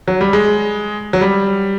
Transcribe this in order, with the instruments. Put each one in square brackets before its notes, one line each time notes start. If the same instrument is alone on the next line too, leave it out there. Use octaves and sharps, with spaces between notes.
[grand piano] F#3
G3
G#3
F#3
G3